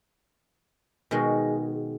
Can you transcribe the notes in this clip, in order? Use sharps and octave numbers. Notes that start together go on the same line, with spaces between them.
B2 D#3 G#3